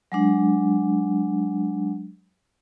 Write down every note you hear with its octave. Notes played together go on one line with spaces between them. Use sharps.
F#3 G#3 D4